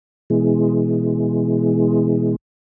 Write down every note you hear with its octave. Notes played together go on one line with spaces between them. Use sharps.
B2 E3 G#3